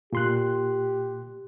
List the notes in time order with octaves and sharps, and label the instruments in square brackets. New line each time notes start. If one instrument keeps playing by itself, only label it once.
[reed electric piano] A#2 C6 F#6 [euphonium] G4